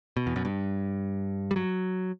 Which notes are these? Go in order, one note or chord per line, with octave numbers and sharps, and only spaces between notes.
B2
E2
F#2
G2
G3
F#3